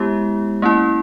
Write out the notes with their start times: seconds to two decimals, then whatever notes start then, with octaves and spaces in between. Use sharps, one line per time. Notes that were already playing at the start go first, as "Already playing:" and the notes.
Already playing: G#3 B3 E4 G4
0.62 A#3 C#4 E4